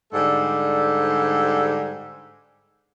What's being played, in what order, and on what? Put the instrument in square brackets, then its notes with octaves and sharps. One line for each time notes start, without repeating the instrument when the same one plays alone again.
[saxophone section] G#2 D3 G3 A4